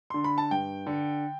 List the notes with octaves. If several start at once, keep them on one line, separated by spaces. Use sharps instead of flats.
D3 C6
B5
A5
G2 G5
D3